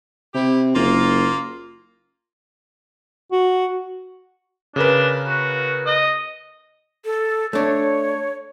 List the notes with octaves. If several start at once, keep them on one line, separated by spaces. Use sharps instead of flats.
C3 E4 G4
F#1 A#3 F4
F#4
C#3 D4 A#4 B4
F#4
D#5
A4
A3 D4 C#5